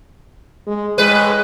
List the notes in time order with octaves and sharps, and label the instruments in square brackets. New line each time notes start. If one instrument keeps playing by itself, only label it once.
[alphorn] G#3
[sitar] A2 B4 [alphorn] G#3